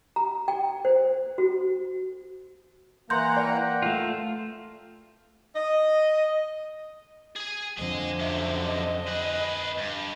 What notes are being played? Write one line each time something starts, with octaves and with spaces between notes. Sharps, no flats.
A#5
G5
C5
F#4
E3 A#3 F#5 A#5 C6 G6
A#4 D5 F#5 G5
A3 F4 F5
D#5
G#4 G#5
F2 D3 G#4 D#5
F#2 C3 E5
D#5
G#4 B4
G2